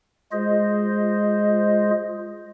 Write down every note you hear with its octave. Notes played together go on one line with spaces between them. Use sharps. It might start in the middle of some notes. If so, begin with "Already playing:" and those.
G#3 F4 G#4 C5 D#5